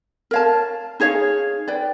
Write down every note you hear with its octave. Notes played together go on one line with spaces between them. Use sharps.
A#4 C#5 F5 A5
D#4 G#4 C#5 F5
B4 D5 G5